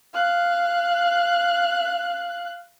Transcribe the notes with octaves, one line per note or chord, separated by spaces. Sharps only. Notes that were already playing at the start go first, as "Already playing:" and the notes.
F5 F#6